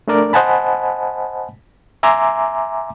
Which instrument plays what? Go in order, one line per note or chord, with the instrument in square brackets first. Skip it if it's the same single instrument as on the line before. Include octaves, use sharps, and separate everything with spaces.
[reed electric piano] A3 D4 A#4 D5
C5 D#5 F#5 G#5 A5 B5
E5 G#5 A#5 C6 D6